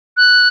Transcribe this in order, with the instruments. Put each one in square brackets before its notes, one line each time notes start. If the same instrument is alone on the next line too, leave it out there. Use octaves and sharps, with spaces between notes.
[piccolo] F#6